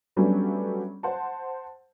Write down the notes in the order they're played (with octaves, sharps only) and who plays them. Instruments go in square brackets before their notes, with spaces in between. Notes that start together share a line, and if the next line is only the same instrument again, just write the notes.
[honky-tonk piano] F#3 G3 A3 B3 C#4 D4
C5 F#5 A5